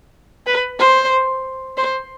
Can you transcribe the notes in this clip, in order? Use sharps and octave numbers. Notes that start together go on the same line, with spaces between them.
B4
C5
C5